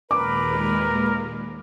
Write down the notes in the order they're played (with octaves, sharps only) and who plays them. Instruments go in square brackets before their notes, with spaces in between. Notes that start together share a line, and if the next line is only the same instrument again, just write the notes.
[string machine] D#2 A#2 G#3 [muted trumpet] A#4 [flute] B4 [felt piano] D6